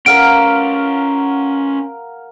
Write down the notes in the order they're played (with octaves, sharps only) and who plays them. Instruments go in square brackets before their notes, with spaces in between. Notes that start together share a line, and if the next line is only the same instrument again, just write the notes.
[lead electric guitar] C#4 B4 [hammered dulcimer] A#4 F5 F#5 [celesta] D7